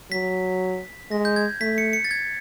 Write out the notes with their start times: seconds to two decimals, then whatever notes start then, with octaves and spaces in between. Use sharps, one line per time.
0.11 F#3 B6
1.11 G#3 A#6
1.25 G6
1.36 G#6
1.61 A3 B6
1.78 C#7
1.93 C#7
2.05 A6
2.11 G#6